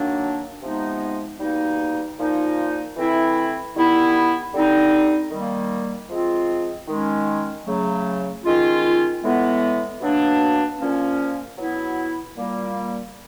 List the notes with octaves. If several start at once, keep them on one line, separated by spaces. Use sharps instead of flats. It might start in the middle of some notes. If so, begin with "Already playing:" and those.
Already playing: D#3 F#3 A#3 D4
C3 F3 G#3 B3 D#4
B2 G3 A#3 D#4
A#2 F3 A#3 D#4
E3 A3 C4 E4
D#3 G3 B3 E4
D3 G3 C4 D#4
D#3 G3 A#3
F3 G#3 C4 F4
D#3 G#3 C#4
C#3 F#3 A3
D#3 G#3 C#4 F4
A2 E3 G#3 B3
B2 F#3 A#3 D4
A#2 F3 A#3 C#4
B2 F#3 B3 E4
A#2 G3 A#3